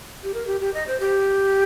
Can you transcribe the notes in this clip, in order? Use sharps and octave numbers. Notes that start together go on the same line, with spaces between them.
G4
A#4
G4
G4
D#5
C5
G4